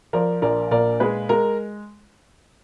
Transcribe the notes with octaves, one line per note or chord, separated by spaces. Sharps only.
F3 A#4 D5
A#1 A#4 D5
A#2 A#4 D5
G#3 G#4 B4
G#3 A#4